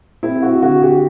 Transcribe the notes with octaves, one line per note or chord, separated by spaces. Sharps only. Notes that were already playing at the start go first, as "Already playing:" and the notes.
C4 E4
F#4
D3 F#4
G4